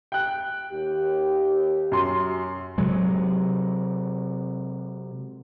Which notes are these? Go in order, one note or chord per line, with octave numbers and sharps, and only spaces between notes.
G5 F#6
D#2 G4
F#2 C6
C3 F#3 G#3